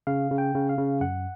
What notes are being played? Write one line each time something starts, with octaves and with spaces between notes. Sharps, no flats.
C#3 F5
C#3
G5
C#3
F5
C#3
F#2 F#5